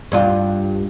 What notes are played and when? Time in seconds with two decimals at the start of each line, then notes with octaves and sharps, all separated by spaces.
0.12 G2 D4 F4